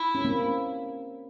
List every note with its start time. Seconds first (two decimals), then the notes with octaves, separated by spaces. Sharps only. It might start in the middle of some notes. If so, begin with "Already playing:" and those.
Already playing: E4
0.15 C#4
0.25 A#3 C4